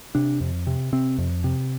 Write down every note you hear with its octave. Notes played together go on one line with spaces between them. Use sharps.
C3 D4
F2
C3
C3 C4
F2
C3